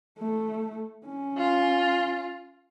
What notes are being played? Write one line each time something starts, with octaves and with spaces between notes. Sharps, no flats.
A3
C#4
F4